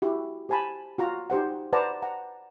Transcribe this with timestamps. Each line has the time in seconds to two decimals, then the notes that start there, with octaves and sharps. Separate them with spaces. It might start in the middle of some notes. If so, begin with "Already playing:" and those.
0.02 E4 F#4 G4
0.49 G4 C5 G#5 A5 B5
0.98 F4 F#4 A#5
1.30 D#4 G4 C5 F#5
1.73 B4 C5 D5 F#5 A5 A#5
2.02 F#5 A#5